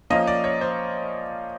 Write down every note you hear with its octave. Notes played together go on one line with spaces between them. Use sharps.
F3 A#3 C#4 F4 D#5
D5
C#5
C5